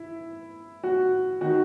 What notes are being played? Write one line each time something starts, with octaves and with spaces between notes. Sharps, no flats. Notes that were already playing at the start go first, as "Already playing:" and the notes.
Already playing: E4
F#4
D#3 F#4